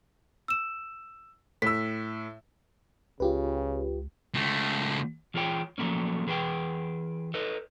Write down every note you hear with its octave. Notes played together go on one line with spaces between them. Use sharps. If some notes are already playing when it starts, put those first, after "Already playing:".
E6 E7
A2 E6 B6
C#2 C#3 F4 G4 B4
C#2 A3
E3 F4 G#4 C#5 G5
F3 F#3 A3 A#3 C#4
E3 G#4 B4 D5 G5
A4 B4 D#5